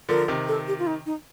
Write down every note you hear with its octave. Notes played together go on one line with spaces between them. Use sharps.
D3 F3 A#4
C3 D#3
A4
G4
F4
D#4
D#4